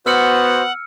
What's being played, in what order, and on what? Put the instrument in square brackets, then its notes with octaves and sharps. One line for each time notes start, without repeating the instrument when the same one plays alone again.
[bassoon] B3 [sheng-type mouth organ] F#4 C5 [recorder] F#5 [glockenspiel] E6 F6 C#7